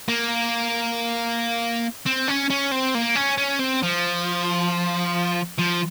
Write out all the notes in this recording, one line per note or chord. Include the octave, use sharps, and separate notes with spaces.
A#3
C4
C#4
C#4
C4
A#3
C#4
C#4
C4
F3
F3